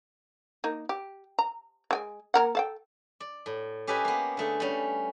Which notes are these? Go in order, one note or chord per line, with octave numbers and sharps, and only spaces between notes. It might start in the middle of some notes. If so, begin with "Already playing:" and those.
A#3 D#4
G4
A#5
G#3 G5 G#5
A#3 A#4 F#5
A4 F5 G5
D5
A2
C#4 G4 A4 B4 D#5 G#5
A#3 B3
D3 A3 G#4
G3 C#4